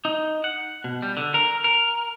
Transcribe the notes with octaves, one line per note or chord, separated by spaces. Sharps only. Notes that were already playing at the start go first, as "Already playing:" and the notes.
D#4
F#5
B2
G3
D3
A#4
A#4